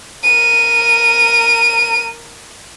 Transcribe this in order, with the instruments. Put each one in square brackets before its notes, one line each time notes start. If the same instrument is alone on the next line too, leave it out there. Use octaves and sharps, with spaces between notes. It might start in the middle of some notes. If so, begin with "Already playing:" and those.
[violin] A#4 D#7